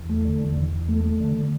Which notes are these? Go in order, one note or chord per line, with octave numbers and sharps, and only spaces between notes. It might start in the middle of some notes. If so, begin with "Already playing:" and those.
Already playing: E2
A3
D3
E2
E2
E2
A3
A3
D3
D3